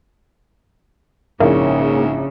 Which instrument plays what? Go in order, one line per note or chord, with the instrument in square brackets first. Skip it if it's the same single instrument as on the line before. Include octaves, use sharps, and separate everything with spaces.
[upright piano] A#1 E4 C#5 [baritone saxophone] G#2 [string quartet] C#3 [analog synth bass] A#3